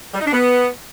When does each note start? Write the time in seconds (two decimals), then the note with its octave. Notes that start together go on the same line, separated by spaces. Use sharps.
0.14 G3
0.20 D#4
0.26 D4
0.33 B3